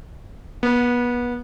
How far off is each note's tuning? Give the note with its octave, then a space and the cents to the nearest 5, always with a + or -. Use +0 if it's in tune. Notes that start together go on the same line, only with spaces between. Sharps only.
B3 -25